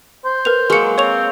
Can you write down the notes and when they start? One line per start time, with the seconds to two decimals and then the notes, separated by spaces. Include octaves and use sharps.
0.25 C5
0.45 A#4 B4 F7
0.70 F#3 G#3 A#3 A#4 C#7
0.98 C4 C#5 C#6 F7